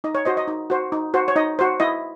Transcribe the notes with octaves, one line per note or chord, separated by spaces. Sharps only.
D#4 D#5
C#5
F#4 C5 D#5
D#5
D#4
F#4 C5
D#4
F#4 C5
C#5
D#4 D#5
F#4 C5
E4 D#5